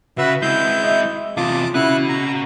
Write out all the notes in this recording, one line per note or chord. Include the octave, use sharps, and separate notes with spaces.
C#3 F#4 B4 E5
G#3 C4 E4 G6
D#5 E5
E2 C3 F4 A5 D6 D#6
C#3 B3 E4 F#4 F#6
A#5